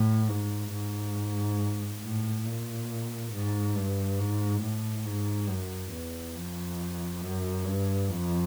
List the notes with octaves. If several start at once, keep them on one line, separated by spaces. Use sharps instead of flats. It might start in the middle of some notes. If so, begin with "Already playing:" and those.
Already playing: A2
G#2
G#2
A2
A#2
G#2
G2
G#2
A2
G#2
F#2
E2
F2
F#2
G2
F2